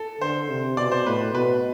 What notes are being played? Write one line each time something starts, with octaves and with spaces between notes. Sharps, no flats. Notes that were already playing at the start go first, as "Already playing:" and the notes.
Already playing: A4
D3 C5
C3
B2 D5
C5
A2 B4
B2 B4